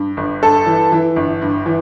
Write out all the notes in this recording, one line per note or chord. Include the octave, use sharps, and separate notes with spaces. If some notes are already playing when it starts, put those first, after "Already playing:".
Already playing: G2
G1
G2 A4
E3
E3
G1
G2
E3